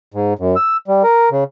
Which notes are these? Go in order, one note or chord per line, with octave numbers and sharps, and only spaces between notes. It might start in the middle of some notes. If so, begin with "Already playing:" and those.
G#2
F#2
E6
G3
A#4
C#3